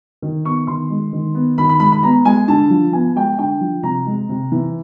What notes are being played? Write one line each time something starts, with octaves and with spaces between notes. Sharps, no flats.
D#3
B3 C#6
D#3 C6
G#3
D#3
B3
D#3 B5
B5
G#3 B5
B5
B3 A#5
G#3 G#5
D3 A5
F3
B3 G#5
G#3 G5
D3 G5
F3
C3 A#5
G#3
C3
E3